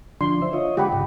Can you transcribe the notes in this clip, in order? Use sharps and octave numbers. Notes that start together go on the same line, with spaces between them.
D3 F3 D4 C6
C5 E5
F4 C#5 D#5
D3 G#3 G4 F#5 B5
G#2 C#3